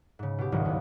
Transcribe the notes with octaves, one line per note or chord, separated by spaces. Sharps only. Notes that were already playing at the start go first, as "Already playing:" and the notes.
G#2 C#3
B2 G4
F#1 C2 F2 G#2 C3 D#3
D#2 G#2